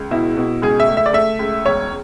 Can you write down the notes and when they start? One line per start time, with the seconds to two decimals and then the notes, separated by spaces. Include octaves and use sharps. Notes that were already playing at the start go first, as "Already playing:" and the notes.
Already playing: C#2
0.11 B2 E4
0.37 B2
0.62 C#2 G#4
0.80 E5
0.88 A3
0.97 E5
1.06 D5
1.13 A3 E5
1.39 C#2
1.65 E1 C#5